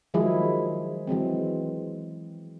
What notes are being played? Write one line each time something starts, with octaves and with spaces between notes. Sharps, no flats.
D#3 F3 F#3 G#3 E4 G#4
E3 F#3 G#3 C4